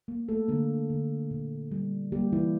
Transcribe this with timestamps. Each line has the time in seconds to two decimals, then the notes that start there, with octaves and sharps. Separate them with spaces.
0.08 A#3
0.29 A3 A4
0.49 D3 A#3 A#4
0.90 D3
1.31 A#2
1.71 G3
2.12 G3 A#3 G4
2.32 E3 E4